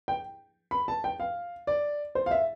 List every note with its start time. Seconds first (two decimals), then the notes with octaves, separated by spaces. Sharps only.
0.08 G5
0.71 B5
0.88 A5
1.04 G5
1.20 F5
1.67 D5
2.15 C5
2.26 F5
2.31 E5